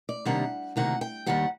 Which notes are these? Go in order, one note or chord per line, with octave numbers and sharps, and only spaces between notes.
D5
C3 D#3 G3 A#3 D4 F#5
D2 C3 D#3 A#3 F#5
G5
D#2 D#3 G3 F#5